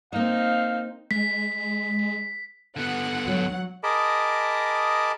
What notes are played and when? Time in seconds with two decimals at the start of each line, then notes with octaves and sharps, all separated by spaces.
0.13 A#3 C4 D#4 D#5 F5
1.11 G#3 B6
2.77 D3 B3 F#5
3.28 F#3
3.83 G#4 A#4 D#5 A5 B5 D6